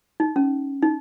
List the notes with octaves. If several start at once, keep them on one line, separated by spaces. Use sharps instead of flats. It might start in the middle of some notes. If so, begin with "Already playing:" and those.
D#4
C#4
D#4